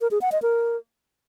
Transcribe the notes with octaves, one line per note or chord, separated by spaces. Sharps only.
A#4
G#4
F#5
D#5
A#4